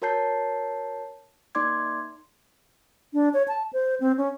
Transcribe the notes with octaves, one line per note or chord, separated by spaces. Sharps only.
F#4 A#4 C#5 A5 G6 C7
A#3 D#4 D5 C6 D6 G#6
D4
C#5
A5
C5
C4
C#4